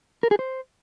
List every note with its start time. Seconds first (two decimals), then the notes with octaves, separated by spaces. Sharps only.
0.23 A#4
0.31 G#4
0.39 C5